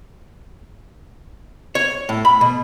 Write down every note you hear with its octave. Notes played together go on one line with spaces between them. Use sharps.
C#5
A2
B5
B2